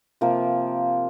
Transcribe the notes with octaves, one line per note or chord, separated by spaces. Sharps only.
C3 F3 A#3 F4